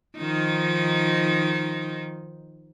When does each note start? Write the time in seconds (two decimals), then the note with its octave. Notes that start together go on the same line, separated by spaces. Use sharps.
0.17 D#3 F3 D#4